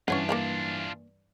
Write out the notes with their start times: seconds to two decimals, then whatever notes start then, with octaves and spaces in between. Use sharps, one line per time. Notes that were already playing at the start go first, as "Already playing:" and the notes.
0.08 G2 E3 C#4 D4 F4 C#5 F#5
0.29 A#3 D5 F5